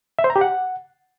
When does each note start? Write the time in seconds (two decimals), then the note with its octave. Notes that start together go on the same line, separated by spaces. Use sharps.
0.19 E5
0.24 C5
0.30 A#5
0.36 G4
0.41 F#5